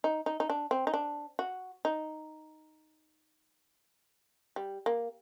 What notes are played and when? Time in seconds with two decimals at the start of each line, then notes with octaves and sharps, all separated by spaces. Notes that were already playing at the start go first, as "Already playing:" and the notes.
0.04 D#4
0.26 D#4
0.40 D#4
0.50 D4
0.71 C4
0.87 D#4
0.94 D4
1.39 F#4
1.85 D#4
4.56 G3
4.86 A#3